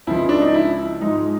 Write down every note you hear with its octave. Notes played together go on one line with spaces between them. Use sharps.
C#2 C#3 F3 G#3 E4
D4
D#4
E4
G#2 F3 G#3 D#4